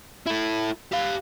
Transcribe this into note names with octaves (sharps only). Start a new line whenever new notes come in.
E4 A4
G4 F5